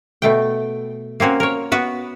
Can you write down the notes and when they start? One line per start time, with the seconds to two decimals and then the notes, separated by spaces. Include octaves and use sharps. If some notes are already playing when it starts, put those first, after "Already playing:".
0.22 B2 A3 G5
1.20 A#3 C4 C#4 F#4
1.40 A#4 C#5
1.72 B3 F#4 B4